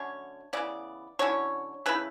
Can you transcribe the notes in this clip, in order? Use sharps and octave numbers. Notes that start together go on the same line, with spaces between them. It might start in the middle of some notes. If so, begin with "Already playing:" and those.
Already playing: D3 F#3 A3 C#4 C#5
C#3 E3 B3 D5
D3 F#3 C#4 E4 C#5
C#3 E3 A3 E4 B4